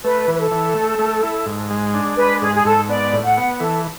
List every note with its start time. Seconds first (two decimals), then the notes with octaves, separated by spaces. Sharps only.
0.04 A3 B4
0.28 E3
0.34 B4
0.39 A4
0.51 E3
0.75 A3
0.99 A3
1.23 E4
1.46 G#2
1.70 G#3
1.94 D4
2.18 G#3 B4
2.42 G#2 G#4
2.55 G#4
2.65 G#2 A4
2.89 B3 D5
3.13 A2
3.25 F#5
3.37 B3
3.60 E3 A4